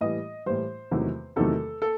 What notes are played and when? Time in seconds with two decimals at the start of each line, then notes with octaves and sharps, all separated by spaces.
0.01 A2 E3 G3 D#5
0.46 A2 E3 G3 C5
0.91 E2 C3 D#3 F#3 A3
1.36 E2 C3 D#3 F#3 A3 A4
1.82 A4